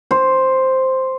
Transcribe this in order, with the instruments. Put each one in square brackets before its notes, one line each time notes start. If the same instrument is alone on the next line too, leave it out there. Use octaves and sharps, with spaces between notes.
[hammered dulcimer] C5